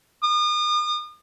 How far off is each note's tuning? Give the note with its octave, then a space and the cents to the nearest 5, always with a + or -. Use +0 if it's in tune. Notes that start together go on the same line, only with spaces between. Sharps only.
D#6 -40